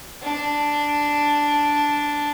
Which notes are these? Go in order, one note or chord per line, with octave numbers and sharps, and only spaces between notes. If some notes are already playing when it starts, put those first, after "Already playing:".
D4